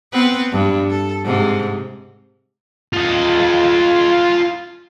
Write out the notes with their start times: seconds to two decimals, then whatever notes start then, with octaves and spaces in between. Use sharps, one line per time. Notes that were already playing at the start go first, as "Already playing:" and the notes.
0.12 B3 C4 B4
0.51 G2
0.90 A4
1.25 G#2 C3
2.93 F4 D#5